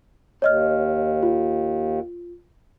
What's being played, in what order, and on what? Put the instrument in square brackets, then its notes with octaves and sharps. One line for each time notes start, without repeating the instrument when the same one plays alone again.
[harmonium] D#2 [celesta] C#5 D#5 F6
[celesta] F4